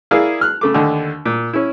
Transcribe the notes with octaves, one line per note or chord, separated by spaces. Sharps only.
E4 G#4 A#4 D5 F5
F6 F#6
C#3 A3 D6
D#2 D3
A#2
C#4 E4